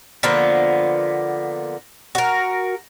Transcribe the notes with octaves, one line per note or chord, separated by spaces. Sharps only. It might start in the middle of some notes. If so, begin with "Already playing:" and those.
D3 F3 A#3 B3
F#4 A#4